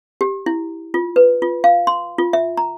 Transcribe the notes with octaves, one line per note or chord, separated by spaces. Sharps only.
G4
E4
F4
B4
F4
F5
C6
F4
E5
A#5